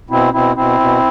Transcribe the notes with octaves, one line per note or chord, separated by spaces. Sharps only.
B2 C4 E4
B2 C4 E4
B2 C4 E4
B2